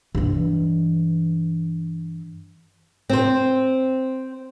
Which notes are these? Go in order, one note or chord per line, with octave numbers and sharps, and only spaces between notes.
G2 E3
C4 C5